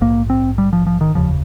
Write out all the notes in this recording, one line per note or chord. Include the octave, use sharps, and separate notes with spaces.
A#1 G#2 A#3
C4
G3
F3
F3
D#3
F1 D#2 C#3 F3